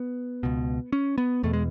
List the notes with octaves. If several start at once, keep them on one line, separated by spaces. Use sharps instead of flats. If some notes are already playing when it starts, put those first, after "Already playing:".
Already playing: B3
C#2 B2
C#4
B3
E2 B2 A3
G#3